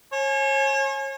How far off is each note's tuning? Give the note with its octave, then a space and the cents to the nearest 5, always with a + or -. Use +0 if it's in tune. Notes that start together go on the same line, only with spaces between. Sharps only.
C#5 -35 G#5 +25